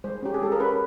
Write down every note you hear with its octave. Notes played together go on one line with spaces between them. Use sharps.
G#3 C5
C#4 G4
G#4
G#3 A4
A#4
C#4 B4